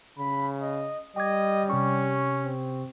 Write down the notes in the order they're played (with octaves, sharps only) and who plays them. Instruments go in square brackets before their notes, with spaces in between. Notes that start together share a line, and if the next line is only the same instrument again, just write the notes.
[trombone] C#3 [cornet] B5
[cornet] D#5
[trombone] G3 [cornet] D#5 [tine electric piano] G5 D6 G#6
[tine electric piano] C3 G4 C#6 [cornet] C#4
[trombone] C4